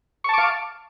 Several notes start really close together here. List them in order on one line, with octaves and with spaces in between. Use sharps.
C#6 A5 D6 F5